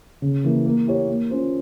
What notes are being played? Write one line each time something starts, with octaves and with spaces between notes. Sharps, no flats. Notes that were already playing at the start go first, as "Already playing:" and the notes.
C#3
E3 A#3 E4
A#3
E4 G4 C#5
A#3
C#4 F4 C5